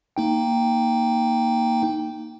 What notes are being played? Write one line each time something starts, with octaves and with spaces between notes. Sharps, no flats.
A#3 D#4 G5